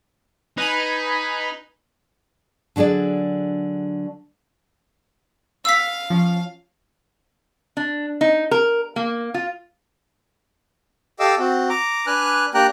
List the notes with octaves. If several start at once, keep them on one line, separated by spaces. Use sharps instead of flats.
D#4 B4 G#5 B5
D3 F#3 D4 G#4 D5
F5 E6 B6
F3 C#4
D4
D#4
A#4
A#3
F4
G4 A4 D#5 F5 D6 E6
C4 F#4
A#5 D6
D4 B4 G#5 F6 F#6
A#3 D4 G4 G5 A#5 F#6